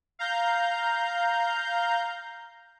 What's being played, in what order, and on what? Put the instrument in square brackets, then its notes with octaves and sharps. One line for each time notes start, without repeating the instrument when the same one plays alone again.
[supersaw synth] F5 A#5 G6